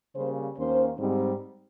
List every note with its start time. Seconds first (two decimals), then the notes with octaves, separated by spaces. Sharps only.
0.15 C#3 G3 A#3 C#4 C5
0.57 D#2 D#3 A#3 C#4 C5
0.99 G#2 G3 C4